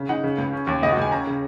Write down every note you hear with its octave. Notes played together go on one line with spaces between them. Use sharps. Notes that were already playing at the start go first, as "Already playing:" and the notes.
Already playing: C#3
D#4 F#5
C#3
C#2
C#4
D#2
C#2 D#5
F#4
C#2 G#5
C#4 A#5
C#3